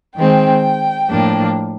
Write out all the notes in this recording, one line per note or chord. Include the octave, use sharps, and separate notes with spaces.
D#3 G#3 C4 G5
A2 F3 A#3 D4